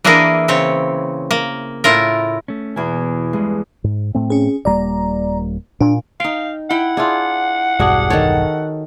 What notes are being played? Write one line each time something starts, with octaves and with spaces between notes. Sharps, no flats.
E3 A#3 D4 E4 G#4 A#4
C#3 C4 C#5
A#3
A2 E4 F4 A#4
A3 C#4
E2 B2 E3 E4 G#5
G2 G#3
G#2
A2 A3 C4
C#4 G#4
D#1 G3 A#3 D5 A#5
A#2 D4
D#4 F5 G5
E4 F#5 G5 B5
D4 E4 F4 G#4
E1 B1 G2 D4 F#4 G#4
D#3 F#4 A4 C#5